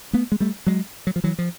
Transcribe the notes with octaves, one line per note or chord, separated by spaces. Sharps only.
A3 B3
G#3
G3 A3
F#3 G#3
F#3
F3
E3 F#3
F3